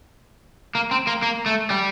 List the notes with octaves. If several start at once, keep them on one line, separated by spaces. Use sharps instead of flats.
A#3
C4
A#3
A#3
A3
G3